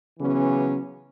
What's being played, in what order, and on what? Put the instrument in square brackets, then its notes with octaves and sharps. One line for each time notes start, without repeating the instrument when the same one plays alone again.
[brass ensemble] C#3 E3 F#3 B3 C#4